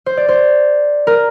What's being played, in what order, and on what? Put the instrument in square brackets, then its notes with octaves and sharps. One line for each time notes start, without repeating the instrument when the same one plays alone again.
[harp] C5
D5
C5
A#4